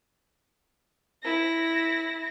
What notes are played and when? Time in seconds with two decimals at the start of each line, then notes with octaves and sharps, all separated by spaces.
1.23 E4 A#6